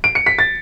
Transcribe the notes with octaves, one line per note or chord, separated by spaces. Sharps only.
D7
C#7
B6
A6